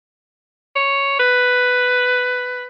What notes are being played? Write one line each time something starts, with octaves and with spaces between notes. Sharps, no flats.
C#5
B4